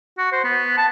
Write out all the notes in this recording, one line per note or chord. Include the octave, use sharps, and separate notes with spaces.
F#4
C5
B3
A5